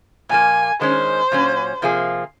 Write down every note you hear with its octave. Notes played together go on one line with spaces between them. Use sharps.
A#2 F3 A#3 G#5
D#3 G#3 C#4 C5
A#2 F#3 C#4
C3 F3 A#3 F4 G#4